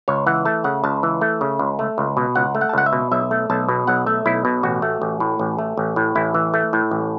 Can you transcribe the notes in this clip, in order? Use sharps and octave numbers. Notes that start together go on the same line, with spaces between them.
C#2 C#5
E3 F#5
A3 A5
C#3 F#5
C#2 A5
E3
A3
C#3
C#2
A3
C#2
B2
C#2 F#5
A3
F#5
A5
C#2 F#5
E5
B2
B1 E5
A3
B1 A5
B2
B1 F#5
A3 E5
B1 E4
B2
A1 F#4
A3
A1
A2
A1
A3
A1
A2
A1 E4
E3
A3
A2
A1